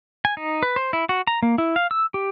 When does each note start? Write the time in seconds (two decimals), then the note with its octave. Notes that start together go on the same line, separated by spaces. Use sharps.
0.25 G#5
0.37 D#4
0.63 B4
0.76 C5
0.93 E4
1.09 F#4
1.27 A#5
1.43 A#3
1.58 E4
1.76 F5
1.91 E6
2.14 G4